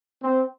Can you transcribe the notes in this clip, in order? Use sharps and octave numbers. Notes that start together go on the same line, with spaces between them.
C4